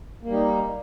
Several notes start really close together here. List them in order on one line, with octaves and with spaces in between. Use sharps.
A#3 G3 D#4